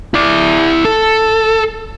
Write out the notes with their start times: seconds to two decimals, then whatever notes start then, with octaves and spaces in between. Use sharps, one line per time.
0.14 E4 D5
0.85 A4